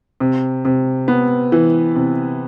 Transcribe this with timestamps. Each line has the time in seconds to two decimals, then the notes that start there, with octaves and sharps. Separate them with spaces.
0.20 C3
0.65 C3
1.08 B3
1.52 E3
1.96 C3